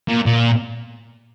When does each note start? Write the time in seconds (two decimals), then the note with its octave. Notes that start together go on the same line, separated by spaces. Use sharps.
0.08 A#2
0.26 A#2